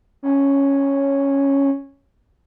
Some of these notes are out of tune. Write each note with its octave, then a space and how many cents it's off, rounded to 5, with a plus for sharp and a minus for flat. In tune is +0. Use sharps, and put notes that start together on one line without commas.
C#4 -5